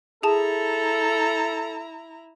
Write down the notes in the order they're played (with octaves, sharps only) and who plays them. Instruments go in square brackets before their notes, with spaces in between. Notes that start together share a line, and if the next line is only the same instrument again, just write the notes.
[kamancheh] E4 A#5 [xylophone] G#4 A5 [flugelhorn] A4